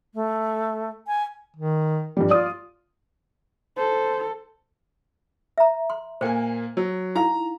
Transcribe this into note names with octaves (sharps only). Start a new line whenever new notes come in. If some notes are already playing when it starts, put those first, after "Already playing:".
A3
G#5
D#3
G2 F3 G3
F4 D5 D#6
A4 C5
E5 A#5
C6
A#2 A#3 C5 G5 G#5
F#3
D#4 E4 F5 A#5